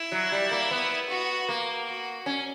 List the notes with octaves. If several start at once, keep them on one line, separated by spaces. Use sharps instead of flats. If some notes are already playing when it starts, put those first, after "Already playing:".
Already playing: E4
F#3
G3
A#3
B3
F#4
A#3
F#4
C#4